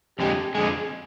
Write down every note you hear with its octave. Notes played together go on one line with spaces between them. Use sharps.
F2 D3 G#3 G4
F2 D3 G#3 G#4